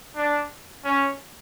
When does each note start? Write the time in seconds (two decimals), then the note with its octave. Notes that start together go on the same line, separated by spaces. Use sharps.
0.16 D4
0.84 C#4